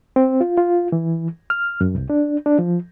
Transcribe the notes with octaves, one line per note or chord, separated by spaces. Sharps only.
C4
F4
F4
E3
F6
F#2
C2
D4
D4
F3